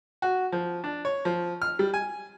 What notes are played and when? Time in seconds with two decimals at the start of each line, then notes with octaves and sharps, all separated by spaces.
0.22 F#4
0.52 F3
0.84 D4
1.05 C#5
1.25 F3
1.62 F6
1.79 G3
1.94 G#5